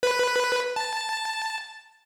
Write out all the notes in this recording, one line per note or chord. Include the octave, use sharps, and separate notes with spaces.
B4
A5